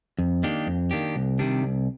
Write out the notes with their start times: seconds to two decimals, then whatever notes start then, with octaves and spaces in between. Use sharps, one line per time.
0.19 F2
0.43 D#3 A#3 D4 G4
0.67 F2
0.91 D#3 A#3 D4 G4
1.16 C2
1.39 C3 D#3 G3 D4
1.63 C2